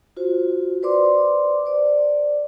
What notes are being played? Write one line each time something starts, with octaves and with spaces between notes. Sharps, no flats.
F4 F#4 C5
B4 C5 D5 C6 D6
C5 D5